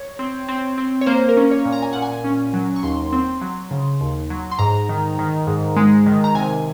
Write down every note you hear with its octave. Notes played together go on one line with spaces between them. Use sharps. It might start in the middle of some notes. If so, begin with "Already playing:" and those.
Already playing: C#5
C4
C4
C4
C#5
A#3 C5
A#4
C#4
C#5
A#2
A#5
G#5
A#2 F#5
G#5
C#4
F#3
C#6
D#2 C6
C4
F#3
C#3
D#2
F#3
C6
G#2 A#5
D#3
D#3
G#2
G#3
D#3
A#5
C3 G#5